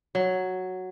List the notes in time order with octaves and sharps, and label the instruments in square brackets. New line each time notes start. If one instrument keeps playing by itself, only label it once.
[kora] F#3